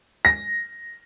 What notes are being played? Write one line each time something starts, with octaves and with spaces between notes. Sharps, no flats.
A#6